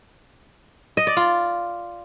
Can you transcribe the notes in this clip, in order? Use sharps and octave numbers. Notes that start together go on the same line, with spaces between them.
D#5
D5
F4